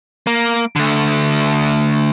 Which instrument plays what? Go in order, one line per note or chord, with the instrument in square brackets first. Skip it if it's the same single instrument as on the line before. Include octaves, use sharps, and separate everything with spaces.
[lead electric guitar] A#3
D3 A3